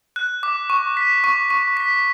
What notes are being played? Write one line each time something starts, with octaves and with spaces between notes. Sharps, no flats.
F#6
D6
C#6
B6
C#6
C#6
B6